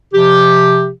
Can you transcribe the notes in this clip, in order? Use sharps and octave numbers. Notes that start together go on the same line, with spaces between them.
C3 F3 G4